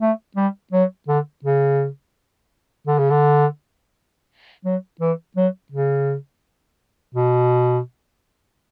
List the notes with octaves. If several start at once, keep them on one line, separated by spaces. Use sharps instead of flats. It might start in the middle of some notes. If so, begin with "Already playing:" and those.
A3
G3
F#3
D3
C#3
D3
C#3
D3
F#3
E3
F#3
C#3
B2